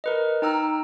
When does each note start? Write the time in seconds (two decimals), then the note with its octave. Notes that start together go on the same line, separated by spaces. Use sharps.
0.04 A#4 B4 D#5
0.42 D#4 G5 A#5 E6 F6